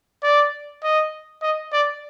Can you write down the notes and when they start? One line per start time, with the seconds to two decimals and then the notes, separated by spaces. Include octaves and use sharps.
0.23 D5
0.83 D#5
1.42 D#5
1.73 D5